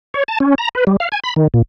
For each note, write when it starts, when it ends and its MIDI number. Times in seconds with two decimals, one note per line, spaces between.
0.14 0.23 73
0.28 0.38 81
0.40 0.55 61
0.58 0.69 82
0.75 0.85 71
0.87 0.96 55
1.00 1.09 77
1.12 1.20 80
1.24 1.34 83
1.36 1.48 51
1.54 1.62 46